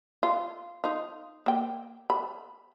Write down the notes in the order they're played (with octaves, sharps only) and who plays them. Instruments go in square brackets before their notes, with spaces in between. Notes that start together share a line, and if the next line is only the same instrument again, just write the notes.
[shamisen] F4
D#4 F4
A#3 G5
B5